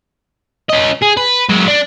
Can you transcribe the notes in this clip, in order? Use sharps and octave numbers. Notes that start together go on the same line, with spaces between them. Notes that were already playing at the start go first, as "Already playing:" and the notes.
C#4 D#5
G#4
B4
F#3 G#3
D4